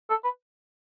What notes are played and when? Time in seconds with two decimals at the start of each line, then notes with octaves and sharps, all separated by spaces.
0.10 A4
0.24 B4